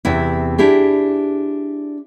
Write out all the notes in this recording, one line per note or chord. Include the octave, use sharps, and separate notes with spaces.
E2 C3 E4
D4 E4 G4 G#4